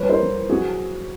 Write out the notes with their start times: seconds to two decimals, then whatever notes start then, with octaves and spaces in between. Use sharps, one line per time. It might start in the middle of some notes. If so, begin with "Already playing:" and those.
Already playing: F3 G3 B4 C#5
0.09 A#4 C5
0.20 F3
0.49 F#3 F#4 G#4